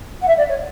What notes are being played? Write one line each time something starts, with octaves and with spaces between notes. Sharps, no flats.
F#5
E5
D5
C#5